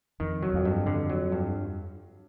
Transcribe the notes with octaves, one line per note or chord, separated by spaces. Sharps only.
F2 D#3
F#3
F2
G2
D3
F#3
G2